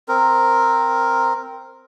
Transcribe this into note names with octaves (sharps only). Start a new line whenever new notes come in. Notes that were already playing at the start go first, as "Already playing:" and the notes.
C4 A#4